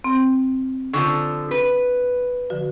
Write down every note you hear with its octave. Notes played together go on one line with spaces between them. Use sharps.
C4
D3 F3 C#6
B4
D3 F3 F#4